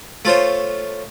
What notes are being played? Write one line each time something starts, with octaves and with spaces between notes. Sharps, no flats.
A3 F4 C5 C#5